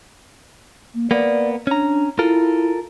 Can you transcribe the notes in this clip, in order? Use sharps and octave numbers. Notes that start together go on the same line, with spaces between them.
A#3
A#3 B3 D5
C#4 D4 A#5
E4 F4 A4 A#4